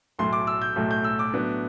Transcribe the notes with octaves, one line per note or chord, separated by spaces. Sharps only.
B1 A2 F#3 A3 C6
D6
E6
G6
B1 A2 F#3 A3
G6
E6
D6
A2 F#3 B3 D4